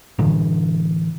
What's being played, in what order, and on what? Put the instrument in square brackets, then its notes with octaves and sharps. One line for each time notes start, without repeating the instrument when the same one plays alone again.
[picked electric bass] A2 D3 E3